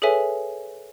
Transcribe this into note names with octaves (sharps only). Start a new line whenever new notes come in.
G#4 A4 B4 C#5 E5 G#5